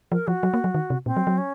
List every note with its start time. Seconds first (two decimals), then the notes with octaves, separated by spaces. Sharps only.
0.12 F3 A#4
0.27 F3 F#4
0.43 F#3
0.54 A#3
0.64 F#3
0.74 D#3
0.90 C3
1.06 A#2 C4
1.17 F#3
1.27 F#3
1.38 C#4